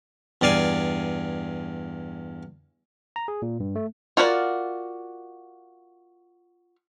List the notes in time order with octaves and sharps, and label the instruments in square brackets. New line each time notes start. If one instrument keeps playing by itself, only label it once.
[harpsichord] E2 G2 D5 F5 G#5
[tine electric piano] A#5
G#4
A#2
G2
A3
[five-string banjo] F4 F#4 A#4 C#5 D5